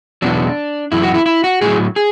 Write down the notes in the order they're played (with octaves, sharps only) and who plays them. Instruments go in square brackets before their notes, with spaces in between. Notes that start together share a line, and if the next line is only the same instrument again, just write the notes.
[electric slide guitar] E2 B2 F#3 D4
F#2 E3 E4
F#4
E4
E4
F#4
A2 F#3 G#4
G#4